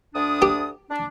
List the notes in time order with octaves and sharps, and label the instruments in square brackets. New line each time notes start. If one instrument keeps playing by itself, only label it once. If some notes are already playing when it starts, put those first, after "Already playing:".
[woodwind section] D2 D4 D#6
[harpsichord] G4
[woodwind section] D4